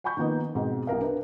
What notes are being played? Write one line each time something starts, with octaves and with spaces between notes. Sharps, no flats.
F#5 G#5 B5 C#6 G6
D#3 F3 A#3 B3 D#4
F2 G#2 B2 G#3 C4
C2 C3 A#4 F5
D4 A#4 B4